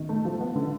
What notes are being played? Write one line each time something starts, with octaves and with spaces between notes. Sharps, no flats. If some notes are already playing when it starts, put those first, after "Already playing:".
Already playing: D#3
A3
F3
B3
D3